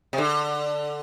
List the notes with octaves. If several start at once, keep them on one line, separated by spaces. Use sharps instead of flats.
C3
D3